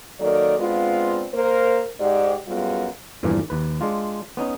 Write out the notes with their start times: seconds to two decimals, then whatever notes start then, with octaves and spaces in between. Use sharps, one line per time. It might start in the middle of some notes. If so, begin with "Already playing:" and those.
0.20 D#3 F#3 A#3 A4 D5
0.59 G#3 B3 C4 D4 F4
1.33 A#3 A#4 C5
2.00 G#2 G4 D5
2.47 F#2 G3 G#3 B3 F4
3.23 E2 G2 A#2 E3 F3 A#3
3.50 D#2 B4
3.81 G#3 D4 F4
4.37 B3 C#4 D#4